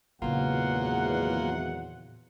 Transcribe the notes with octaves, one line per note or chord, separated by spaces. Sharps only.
G#1 E2 A#2 C#3 F#3 A#3 F4 F#5